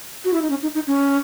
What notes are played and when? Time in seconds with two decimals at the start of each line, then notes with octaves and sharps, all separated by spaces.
0.25 F#4
0.34 E4
0.42 D#4
0.50 C#4
0.62 D#4
0.75 D#4
0.87 C#4